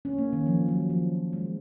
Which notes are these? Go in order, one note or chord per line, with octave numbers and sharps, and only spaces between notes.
C#4
A#3
D#3
F3
F#3
F3
G#3